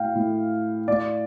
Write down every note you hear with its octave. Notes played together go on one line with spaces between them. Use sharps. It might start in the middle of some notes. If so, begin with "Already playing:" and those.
Already playing: A2 F5 G5
A2
A2 D5